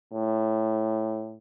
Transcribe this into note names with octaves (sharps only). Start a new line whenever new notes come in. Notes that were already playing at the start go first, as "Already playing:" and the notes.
A2